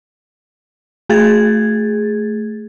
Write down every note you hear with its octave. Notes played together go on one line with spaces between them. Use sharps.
A3 G#4 G#6 A6